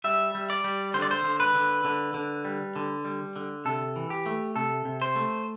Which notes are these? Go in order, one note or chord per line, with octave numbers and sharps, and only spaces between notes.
G3 E5
G3
D5
G3
D3 C5
D5
C5
D3
B4
D3
D3
D3
G3
D3
G3
D3
C3 A4
E3
G4
A3
C3 A4
C3
C5
A3